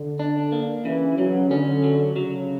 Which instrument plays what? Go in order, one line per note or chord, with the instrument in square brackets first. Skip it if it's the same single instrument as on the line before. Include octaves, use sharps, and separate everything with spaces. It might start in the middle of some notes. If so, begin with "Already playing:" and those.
Already playing: [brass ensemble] D3
[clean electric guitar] D4
A#3
[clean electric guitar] C#3 [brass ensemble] E3
[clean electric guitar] C#3 [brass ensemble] F#3
[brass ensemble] D3 [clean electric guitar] C#4
[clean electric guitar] F#3
[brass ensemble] C#3 [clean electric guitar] F#3